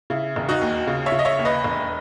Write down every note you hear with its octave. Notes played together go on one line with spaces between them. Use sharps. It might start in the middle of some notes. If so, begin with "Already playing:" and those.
C#3 E4
E1
D#4 F#4
D#2
C#3
C#5 E5
C#3
D#5
C#5 E5
D#2
B4 D#5
E1